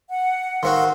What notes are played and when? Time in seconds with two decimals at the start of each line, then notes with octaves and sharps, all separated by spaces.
0.09 F#5
0.63 D#3 C4 F#4 A#4 F5 C6